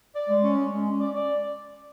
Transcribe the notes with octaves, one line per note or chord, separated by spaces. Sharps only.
D5
G#3
C#4
G#3
G#3
C#4
D5
D5